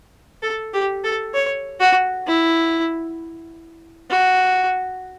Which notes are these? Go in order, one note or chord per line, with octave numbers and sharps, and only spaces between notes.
A4
G4
A4
C#5
F#4
E4
F#4